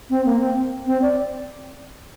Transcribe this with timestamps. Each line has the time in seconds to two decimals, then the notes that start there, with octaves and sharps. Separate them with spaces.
0.10 C4
0.25 A#3
0.40 C4
0.86 C4
1.02 D5